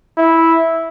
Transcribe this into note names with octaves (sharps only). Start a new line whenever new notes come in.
E4